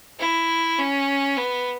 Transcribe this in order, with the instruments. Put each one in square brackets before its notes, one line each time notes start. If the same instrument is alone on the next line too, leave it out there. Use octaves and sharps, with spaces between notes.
[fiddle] E4
C#4
B3